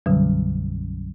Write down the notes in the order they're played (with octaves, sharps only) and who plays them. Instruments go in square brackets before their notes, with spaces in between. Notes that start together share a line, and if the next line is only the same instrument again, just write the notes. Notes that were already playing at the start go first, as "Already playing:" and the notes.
[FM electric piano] B1 F#2 [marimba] D3 G3